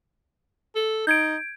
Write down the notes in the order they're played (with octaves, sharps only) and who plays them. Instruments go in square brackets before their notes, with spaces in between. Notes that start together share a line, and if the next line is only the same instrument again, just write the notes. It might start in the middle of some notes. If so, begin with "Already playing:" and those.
[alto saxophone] A4
[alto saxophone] D#4 [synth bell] G6 G#6 D7